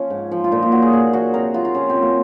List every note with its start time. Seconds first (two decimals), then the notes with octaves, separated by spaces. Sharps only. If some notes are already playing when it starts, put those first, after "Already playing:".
Already playing: F3 C#4
0.10 G#2
0.32 F3
0.44 F4
0.52 A#2 D#4
0.62 F4
0.72 F#3 F#4
0.82 G#4
0.93 A#2 G#4
1.13 F#3 F#4
1.34 C3 A#4
1.54 F#3 F4
1.65 F4
1.75 C3 C#4
1.89 C4
1.96 F#3
2.02 A#3